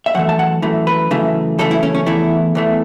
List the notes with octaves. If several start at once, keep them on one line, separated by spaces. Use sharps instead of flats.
E5
F#2 E3 A3 F#5
A5
F#5
F#2 E3 A3
B4
F#2 C#3 E3 A3
F#2 C#3 E3 A3 A4
E4
C#4
C#4
E2 E3 A3 E4
E2 E3 A3